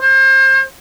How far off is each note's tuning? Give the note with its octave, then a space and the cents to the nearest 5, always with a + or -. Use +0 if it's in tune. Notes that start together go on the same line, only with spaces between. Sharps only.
C5 +35